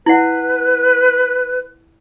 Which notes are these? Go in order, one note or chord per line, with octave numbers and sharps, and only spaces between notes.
E4 B4 F#5